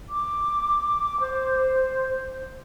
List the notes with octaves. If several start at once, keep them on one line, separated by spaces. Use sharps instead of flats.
D6
C5